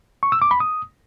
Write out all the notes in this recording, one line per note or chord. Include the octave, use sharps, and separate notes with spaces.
C#6
E6
D6
B5
D#6